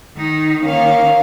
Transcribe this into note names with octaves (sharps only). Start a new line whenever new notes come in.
D#3 D#4
D#3 A#3 C#4 F5